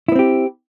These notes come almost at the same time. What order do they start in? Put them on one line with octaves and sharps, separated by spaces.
E4 B3 C4 G4